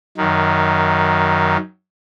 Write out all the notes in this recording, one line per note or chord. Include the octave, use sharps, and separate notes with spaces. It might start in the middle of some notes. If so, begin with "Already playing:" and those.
F#2 D#3